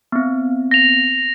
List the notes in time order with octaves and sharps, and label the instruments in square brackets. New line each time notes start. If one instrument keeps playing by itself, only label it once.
[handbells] B3 C4
[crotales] A#6 F7